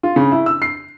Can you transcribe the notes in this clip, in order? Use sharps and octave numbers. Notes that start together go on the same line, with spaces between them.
F4
C#3
E4
E6
C7